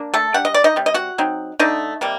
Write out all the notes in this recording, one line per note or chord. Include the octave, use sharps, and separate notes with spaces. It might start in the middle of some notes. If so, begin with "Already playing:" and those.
Already playing: A#3 D4
A3 A4
G3 D4 F#5
D#5
D5
D#4 D#5
C3 G3
D#5
F#4 F#5
F#3 C4 D#4
D3 A3 D4 D#4 D#5
C3 G3 A#3